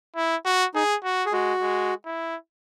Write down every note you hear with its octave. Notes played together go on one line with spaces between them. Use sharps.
E4
F#4
D#4 G#4
F#4
G#4
G#3 F#4
G#3
E4